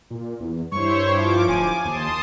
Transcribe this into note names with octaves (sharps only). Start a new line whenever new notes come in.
A#2
E2
G2 E4 C5 C#5 C#6
F3 D6
D1 G#5
D#2 A5 C6 D#6